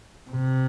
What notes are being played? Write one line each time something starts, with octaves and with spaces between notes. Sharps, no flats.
C3